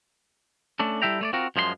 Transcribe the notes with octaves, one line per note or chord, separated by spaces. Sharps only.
A3 C#4 D4 A4
G3 E4 A4 E5 G5 A#5
A3 C#5 D5
C4 F4 F#4 A#4
F#2 F3 G#3 F#4 C6